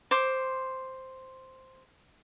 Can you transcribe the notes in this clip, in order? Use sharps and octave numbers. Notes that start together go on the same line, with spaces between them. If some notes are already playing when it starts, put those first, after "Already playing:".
C5 D6